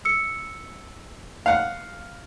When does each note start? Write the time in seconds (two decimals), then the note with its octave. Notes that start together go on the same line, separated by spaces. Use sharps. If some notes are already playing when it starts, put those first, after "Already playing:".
0.05 E6 C#7
1.46 F5 F#5